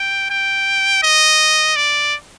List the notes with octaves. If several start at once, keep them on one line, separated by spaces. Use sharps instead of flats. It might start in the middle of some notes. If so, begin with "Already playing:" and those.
Already playing: G5
G5
D#5
D5